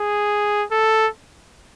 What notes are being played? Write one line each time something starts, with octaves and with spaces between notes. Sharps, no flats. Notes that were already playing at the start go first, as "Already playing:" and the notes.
Already playing: G#4
A4